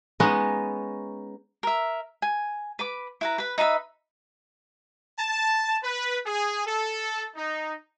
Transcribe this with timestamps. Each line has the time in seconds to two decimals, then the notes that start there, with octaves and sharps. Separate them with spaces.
0.20 G#3 B3 C#4 D#4 D#5
1.63 A#4 E5
2.22 G#5
2.79 B4 B5 D6
3.21 E4 B4 A#5
3.38 B4 B5
3.58 D#4 B4 E5 B5
5.17 A5
5.83 B4
6.25 G#4
6.67 A4
7.36 D#4